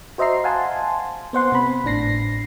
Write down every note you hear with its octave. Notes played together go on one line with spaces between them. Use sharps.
F#4 C5 D#5 E5 A#5 C7
F5 F#5 G#5 A5 C6
B3 C5 F#5 C6
C3 B3 B5
G#1 A2 D4 A#6 C7